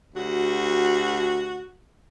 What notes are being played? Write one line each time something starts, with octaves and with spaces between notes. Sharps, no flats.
D2 F#4 G4